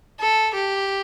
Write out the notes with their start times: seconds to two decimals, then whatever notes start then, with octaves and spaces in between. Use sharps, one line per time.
0.20 A4
0.55 G4